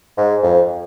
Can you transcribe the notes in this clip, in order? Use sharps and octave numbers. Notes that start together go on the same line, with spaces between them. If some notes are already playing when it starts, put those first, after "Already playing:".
G#2
F2